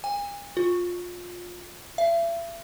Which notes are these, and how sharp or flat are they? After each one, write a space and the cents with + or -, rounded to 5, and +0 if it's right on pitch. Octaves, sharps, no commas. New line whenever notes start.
G#5 -40
F4 +20
E5 +40